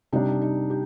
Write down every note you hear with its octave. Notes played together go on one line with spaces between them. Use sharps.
C3 G3 D4 D#4
D#4
G4